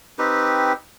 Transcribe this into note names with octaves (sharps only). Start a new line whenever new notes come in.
C4 D#4 G4 B4